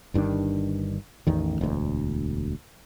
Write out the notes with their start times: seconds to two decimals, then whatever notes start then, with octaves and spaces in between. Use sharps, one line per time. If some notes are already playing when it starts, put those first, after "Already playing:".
0.14 G1 G2 D#3 D4
1.27 A1 E2 D#3
1.61 E1 D2